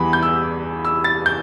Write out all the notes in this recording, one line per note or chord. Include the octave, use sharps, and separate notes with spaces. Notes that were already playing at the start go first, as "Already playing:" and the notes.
Already playing: E2 E3 G3 B3 B5
G6
E6
E6
A6
G6